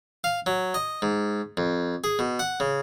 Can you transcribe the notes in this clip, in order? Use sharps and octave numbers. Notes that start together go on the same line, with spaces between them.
F5
F#3
D#5
G#2
F2
G#4
B2
F#5
C#3